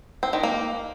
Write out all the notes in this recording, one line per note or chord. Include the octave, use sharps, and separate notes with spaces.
C4
D#3
A#3